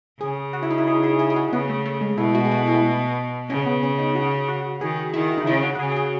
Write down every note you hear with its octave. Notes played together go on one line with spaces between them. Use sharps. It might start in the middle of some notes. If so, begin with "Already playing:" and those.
C#3 G#4
F#4
E4
D#4
E4
G#4
G#4
G#4
G#4
F#4
C#3 B3
A3
A3
G#3
B2 E4
F#4
G#4
F#4
E4
C#3 C#4
B3
C#4
D#4
F#4
F#4
D#3 G#4
D#3 E4
D#4
C#3 E4
F#4
F#4
C#3 G#4
G#4
F#4